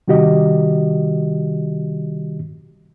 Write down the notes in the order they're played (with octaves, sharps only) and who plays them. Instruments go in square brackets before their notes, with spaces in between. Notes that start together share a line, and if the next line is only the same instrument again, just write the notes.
[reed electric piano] C3 D#3 G3 F#4 G4 D#5